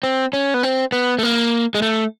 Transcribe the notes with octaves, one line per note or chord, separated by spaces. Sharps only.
C4
C#4
B3
C4
B3
A3
A#3
G#3
A3